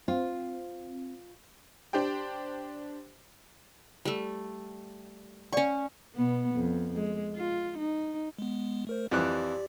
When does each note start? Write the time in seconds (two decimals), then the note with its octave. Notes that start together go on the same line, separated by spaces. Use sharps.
0.08 C4 F4
1.93 D4 G4 C5 G5
4.05 G3 A3
5.53 C#4 D5 F#5 C#6
6.15 B2 B3
6.55 F2
6.95 G#3
7.36 F4
7.78 D#4
8.39 G#3 B3
8.87 A3 A#4 C5
9.11 F2 E3 G4 D5 F#6